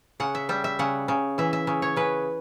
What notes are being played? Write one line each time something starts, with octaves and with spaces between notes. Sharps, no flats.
C#3 F#5
E5
G3 E5
E5
C#3 F#5
C#3
E3 E5
E5
C#3
C#5
C#3 B4